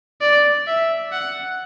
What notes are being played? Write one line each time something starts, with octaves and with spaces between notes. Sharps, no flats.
D5
E5
F#5